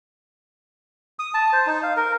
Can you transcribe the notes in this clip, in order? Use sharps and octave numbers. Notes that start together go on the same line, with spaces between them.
D#6
A5
C5
D#4
F5
A#4